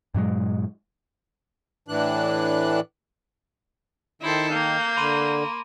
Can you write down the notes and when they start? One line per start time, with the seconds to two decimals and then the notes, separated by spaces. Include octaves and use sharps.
0.15 G2 A#2 F#3 G#3
1.88 A2 E3 D4 F#6
4.22 D#3 D#4 E4 A4 C5
4.52 A#3 F5 G6
4.97 D3 B5 C6 D#7